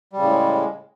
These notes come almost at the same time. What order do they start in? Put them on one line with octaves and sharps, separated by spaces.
G3 C#3 A2 G#3